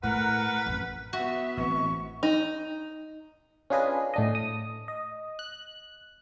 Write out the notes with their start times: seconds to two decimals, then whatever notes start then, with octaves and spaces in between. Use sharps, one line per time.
0.03 A2 A#4 B4 F#5
0.66 A1 F2
1.13 B3 F#4 E5
1.57 A1 C4 C#6
2.23 D#4
3.70 C#4 D4 F4 G#4 B4 D#5
4.14 A2 D4 D#5
4.35 D#6
4.88 D#5
5.39 F#6